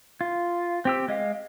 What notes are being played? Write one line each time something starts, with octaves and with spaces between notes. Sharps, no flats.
F4
C4 G4 E6
G#3 D#5 F5